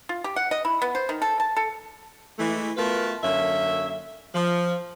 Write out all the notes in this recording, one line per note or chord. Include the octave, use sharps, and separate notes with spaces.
F4
G4
F#5
D#5
E4
B3
C5
D#3
A4
A5
A4
E3 G#3 A3
A3 B3 F4 F#4 A#4 B4
F#2 D3 A#3 C#4 E5
F3